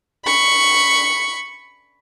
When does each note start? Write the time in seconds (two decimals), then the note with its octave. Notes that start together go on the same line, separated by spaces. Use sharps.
0.25 B5 C#6